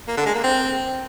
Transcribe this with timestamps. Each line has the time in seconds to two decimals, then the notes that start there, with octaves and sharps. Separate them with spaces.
0.08 A#3
0.17 D3
0.26 G#3
0.35 A#3
0.44 C4